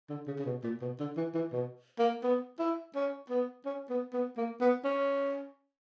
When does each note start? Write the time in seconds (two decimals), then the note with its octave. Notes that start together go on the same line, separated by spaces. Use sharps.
0.10 D3
0.27 C#3
0.39 C#3
0.45 B2
0.64 A#2
0.81 B2
0.99 D3
1.17 E3
1.34 E3
1.52 B2
1.99 A#3
2.23 B3
2.59 E4
2.95 C#4
3.29 B3
3.65 C#4
3.90 B3
4.13 B3
4.37 A#3
4.61 B3
4.84 C#4